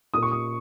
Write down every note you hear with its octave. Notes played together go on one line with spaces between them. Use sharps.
A#2 A#3 D#6
C#6
D#6